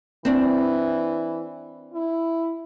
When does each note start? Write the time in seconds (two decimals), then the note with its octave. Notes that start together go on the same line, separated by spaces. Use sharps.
0.25 E3 C4 D4
1.94 E4